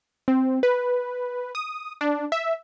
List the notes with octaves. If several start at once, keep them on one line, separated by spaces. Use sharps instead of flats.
C4
B4
D#6
D4
E5